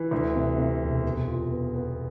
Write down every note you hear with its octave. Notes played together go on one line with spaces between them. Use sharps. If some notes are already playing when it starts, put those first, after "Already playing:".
Already playing: E3
D2
C3
C3
E1
B2
F4
B3
B3